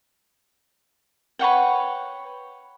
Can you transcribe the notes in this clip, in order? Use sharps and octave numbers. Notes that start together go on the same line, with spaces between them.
B4 C#5 F#5 G5